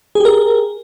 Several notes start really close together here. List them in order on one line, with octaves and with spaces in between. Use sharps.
G#4 G4 A#4